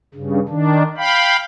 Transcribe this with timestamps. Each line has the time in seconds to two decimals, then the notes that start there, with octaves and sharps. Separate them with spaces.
0.14 G2 C#3
0.49 D#3 D4
0.97 F5 G5 B5